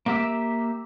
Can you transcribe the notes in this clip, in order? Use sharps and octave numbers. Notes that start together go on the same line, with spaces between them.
A#3 G4 E5